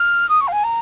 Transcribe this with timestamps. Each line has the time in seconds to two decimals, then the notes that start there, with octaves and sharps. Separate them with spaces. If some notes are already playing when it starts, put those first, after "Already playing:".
Already playing: F6
0.29 D#6
0.41 C#6
0.48 F5
0.52 G#5
0.64 A#5